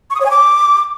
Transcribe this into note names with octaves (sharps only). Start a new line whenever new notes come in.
C#6
D#6
C#5
G#5
D6